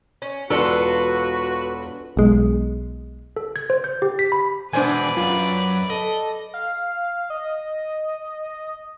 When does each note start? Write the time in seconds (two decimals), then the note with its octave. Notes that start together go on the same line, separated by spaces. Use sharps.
0.22 C#4
0.50 E1 F4 F#4 A4 B4 D5 C#7
2.17 B1 G#3
3.36 A4
3.56 G#6
3.70 C5
3.84 G6
4.02 G4
4.19 B6
4.32 B5
4.73 B2 E3 D4 B4 C5 D5 G#5
5.17 F#2 F4
5.90 A4 D#5
6.54 F5
7.30 D#5